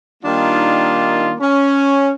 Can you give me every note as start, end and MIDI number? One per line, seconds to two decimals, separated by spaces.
0.24 1.33 51
0.24 1.33 55
0.24 1.33 58
0.24 1.33 62
0.24 1.33 63
0.24 1.33 65
1.40 2.11 61